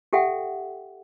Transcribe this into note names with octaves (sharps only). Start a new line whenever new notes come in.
G4 A4 E5 F#5 G5